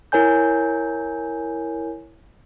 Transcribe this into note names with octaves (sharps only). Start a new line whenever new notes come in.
E4 A#4 C#5 G#5 G6